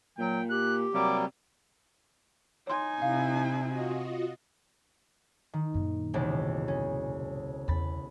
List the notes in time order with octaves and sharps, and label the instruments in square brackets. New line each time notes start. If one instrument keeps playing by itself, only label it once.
[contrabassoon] A#2 [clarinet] F#3 [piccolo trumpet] G5
[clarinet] G4 [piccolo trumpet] F#6
[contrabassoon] C3 [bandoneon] F#3 G3 A#3 [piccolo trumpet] D6
[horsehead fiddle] D#4 G#5 [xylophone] C#5 C6
[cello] C3 [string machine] E4 [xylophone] F5
[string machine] F4 F#4 D#5
[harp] D#3
[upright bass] F#2 A#2
[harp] E1 C#2 C3
C#4
[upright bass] E2 [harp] B5 A6